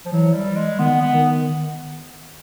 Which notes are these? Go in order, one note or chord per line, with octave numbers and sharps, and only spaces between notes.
F3
E3 F#3
G3
G#3
D#3 B3
B3
D#3